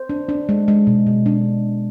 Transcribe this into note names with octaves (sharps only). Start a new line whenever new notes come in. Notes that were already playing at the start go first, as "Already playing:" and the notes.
Already playing: C5
D4
D4
G#3
G#3
B2
B2
D4